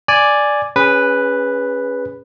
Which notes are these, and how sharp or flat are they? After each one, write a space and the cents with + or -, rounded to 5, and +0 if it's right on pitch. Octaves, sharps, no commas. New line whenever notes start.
D5 +0 G#5 +0
C#4 +0 G#4 -25 B4 +0